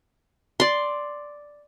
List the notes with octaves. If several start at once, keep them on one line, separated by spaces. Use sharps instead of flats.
D5 C6